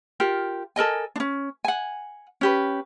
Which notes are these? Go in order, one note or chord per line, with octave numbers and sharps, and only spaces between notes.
F4 G4 A#4
A4 A#4 D#5 G#5
C#4 D4
F#5 G#5
C#4 G4 B4